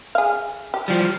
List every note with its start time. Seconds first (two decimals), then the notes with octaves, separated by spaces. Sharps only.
0.15 G#4 F5
0.74 G4
0.88 F3 G3